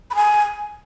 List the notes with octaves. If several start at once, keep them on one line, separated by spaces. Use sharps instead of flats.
B5
G#5